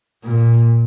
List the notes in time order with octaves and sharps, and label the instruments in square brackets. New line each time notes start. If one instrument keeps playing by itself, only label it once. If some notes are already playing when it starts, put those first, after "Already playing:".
[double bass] A#2